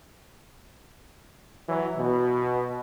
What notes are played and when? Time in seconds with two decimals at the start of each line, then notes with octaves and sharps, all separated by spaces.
1.68 E3 F#3
1.97 B2